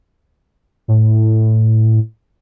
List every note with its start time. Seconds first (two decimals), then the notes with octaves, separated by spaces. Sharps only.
0.88 A2